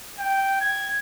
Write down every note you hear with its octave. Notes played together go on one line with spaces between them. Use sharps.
G5
G#6